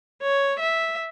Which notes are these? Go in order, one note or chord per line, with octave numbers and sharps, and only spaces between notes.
C#5
E5